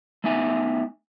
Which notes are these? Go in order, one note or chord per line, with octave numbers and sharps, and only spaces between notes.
A3 B3 D#4 E5 G#5